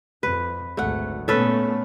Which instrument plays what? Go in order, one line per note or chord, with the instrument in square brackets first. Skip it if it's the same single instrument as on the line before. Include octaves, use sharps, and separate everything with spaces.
[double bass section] F2 [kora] B4
[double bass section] G#1 D2 [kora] A3 F#5
[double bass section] A#2 A3 B3 [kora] C#4 A4 B4